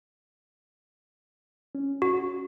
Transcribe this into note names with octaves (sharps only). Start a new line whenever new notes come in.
C#4
F#4